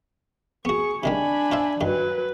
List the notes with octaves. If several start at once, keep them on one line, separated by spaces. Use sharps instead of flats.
B3 F#4 G#4 C#6
C3 D#3 G3 D4 G#5 B5
F4 C5 E5
G2 D#3 F#3 B4